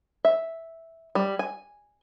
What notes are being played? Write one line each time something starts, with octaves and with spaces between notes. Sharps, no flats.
E5
G3
G#5